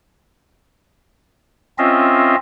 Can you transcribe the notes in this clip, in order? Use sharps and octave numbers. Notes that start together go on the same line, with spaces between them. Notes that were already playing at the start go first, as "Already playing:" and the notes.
C4 C#4 F4 D#5 E5